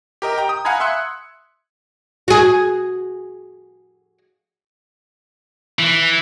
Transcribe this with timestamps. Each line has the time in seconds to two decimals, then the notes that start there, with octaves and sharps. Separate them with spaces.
0.22 G4 A#4 D#5
0.38 G5 A#5
0.49 D#6
0.65 F5 F#5 G#5 A#5 B5 G#6
0.80 E5 C6 E6 F#6 C#7
2.28 F#4 G#4
5.79 E3